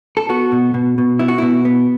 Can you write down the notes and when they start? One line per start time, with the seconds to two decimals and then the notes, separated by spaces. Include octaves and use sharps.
0.17 A4
0.29 B3 F#4
0.52 B2
0.74 B2
0.98 B2
1.19 B3 E4
1.28 F#4
1.38 B2 E4
1.65 B3